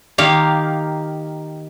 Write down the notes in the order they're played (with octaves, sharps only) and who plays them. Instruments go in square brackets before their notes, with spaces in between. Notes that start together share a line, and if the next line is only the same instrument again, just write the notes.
[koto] D#3 A#3 G4 F5